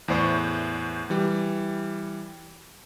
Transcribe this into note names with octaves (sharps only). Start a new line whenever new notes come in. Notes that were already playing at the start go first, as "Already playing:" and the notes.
E2 A2 C5 D5 C#6
E3 G3